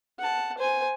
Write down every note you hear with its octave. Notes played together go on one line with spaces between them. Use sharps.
F#5 A5
C5 G#5